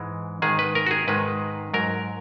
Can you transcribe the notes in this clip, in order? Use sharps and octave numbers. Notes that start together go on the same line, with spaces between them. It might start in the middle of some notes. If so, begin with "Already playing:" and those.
Already playing: G#2 E3 G#3
G#2 D#3 G#3 G#4
B4
A#4
F#4
G#4
G#2 D#3 G#3 B4
G#2 F#3 A#4